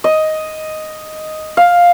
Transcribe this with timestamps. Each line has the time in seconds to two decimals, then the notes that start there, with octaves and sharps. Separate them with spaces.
0.04 D#5
1.57 F5